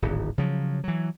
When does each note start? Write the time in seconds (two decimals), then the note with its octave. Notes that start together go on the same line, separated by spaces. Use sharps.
0.02 D1 G#1
0.38 C#3 F3 F#3
0.84 E3 F#3